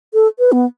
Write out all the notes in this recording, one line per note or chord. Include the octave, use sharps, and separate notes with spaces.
A4
B4
B3